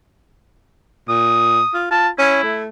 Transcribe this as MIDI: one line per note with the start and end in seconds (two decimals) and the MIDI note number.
1.09 1.62 46
1.09 1.78 87
1.74 1.88 65
1.91 2.09 65
1.91 2.08 81
2.19 2.39 61
2.19 2.62 64
2.43 2.68 57